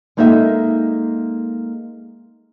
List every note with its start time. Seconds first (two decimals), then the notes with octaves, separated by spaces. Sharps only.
0.17 G#3 A#3 D#4 G#4 A4 E5